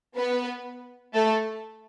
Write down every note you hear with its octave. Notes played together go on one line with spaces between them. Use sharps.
B3 B4
A3 A4